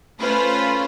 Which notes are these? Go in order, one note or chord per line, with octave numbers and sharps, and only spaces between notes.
A3 C#4 F4 B4 C5